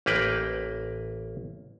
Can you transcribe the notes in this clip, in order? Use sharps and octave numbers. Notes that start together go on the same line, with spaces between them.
A1 A#3 B4 G5